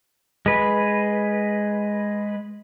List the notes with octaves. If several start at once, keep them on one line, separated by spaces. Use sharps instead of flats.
G#3 B4